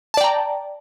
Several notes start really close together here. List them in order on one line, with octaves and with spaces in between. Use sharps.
A5 D5 G5 A#5